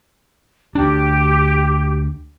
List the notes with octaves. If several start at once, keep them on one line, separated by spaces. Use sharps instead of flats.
D2 D4 G4